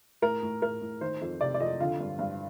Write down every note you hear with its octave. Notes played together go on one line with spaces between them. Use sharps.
A2 A#4
A2
A2 A#4
A2
D#3 C5
F2
C3 D5
D5
F2 D#5
D3 F4
G2
G2